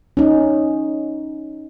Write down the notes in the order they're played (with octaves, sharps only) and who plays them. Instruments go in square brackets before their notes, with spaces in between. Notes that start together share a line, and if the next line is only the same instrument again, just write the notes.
[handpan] C#4 D#4